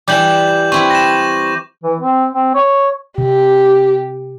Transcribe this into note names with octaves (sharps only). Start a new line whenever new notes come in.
E3 G3 D6 G6 F#7
C4 E4 B4 C#6
A#6 E7
E3
C4
C4
C#5
C3 G4